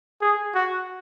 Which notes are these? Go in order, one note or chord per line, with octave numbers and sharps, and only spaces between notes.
G#4
F#4